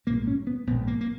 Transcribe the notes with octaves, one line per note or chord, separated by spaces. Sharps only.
A#1 G#2 A#3
C#4
B3
A#1 B3
G#2
A#3
A#3